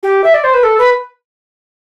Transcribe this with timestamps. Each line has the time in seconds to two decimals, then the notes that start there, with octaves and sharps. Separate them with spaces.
0.02 G4
0.23 E5
0.33 D5
0.43 C5
0.53 B4
0.63 A4
0.78 B4